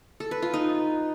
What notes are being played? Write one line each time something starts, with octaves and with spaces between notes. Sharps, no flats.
A4
B4
F4
D#4